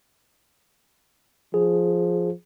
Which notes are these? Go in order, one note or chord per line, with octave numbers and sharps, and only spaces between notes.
F3 G#4